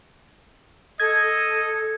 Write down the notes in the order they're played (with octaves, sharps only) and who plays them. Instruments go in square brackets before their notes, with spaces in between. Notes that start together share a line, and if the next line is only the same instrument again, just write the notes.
[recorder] A4 [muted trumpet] D#5 [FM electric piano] G#6